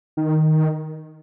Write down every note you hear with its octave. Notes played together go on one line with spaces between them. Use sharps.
D#3